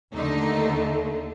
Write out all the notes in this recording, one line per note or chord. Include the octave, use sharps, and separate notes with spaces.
D#2 D3 A3 D#4